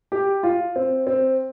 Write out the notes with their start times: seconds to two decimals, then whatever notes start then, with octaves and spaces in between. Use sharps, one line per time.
0.12 G4
0.43 F4
0.76 C4
1.07 C4